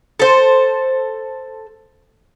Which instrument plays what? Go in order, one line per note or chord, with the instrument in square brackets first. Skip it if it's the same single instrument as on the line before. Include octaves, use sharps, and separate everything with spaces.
[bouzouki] A4 C5